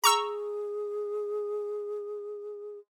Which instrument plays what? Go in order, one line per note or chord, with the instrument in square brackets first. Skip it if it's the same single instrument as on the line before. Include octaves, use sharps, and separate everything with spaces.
[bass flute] G#4 [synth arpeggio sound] A#5 C#6 E6